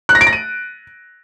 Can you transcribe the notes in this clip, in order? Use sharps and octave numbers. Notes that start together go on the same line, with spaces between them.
F#6
A#6
D7
A#6
D#7